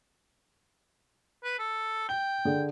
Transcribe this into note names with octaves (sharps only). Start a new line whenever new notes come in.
B4
A4
G5 G7
D3 G#4